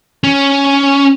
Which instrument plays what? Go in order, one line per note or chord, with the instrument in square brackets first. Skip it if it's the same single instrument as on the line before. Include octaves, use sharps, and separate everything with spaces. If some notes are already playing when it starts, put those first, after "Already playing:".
[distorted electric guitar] C#4